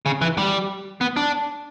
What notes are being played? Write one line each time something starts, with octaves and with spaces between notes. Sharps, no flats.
C#3
E3
G3
B3
D4